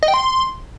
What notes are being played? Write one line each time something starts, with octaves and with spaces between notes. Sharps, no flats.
D#5
G5
C6